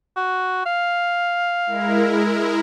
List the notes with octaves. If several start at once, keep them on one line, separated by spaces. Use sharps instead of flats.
F#4
F5
G#3 E4 A#4